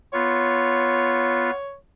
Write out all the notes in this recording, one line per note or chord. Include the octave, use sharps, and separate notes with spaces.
B3 F4 C#5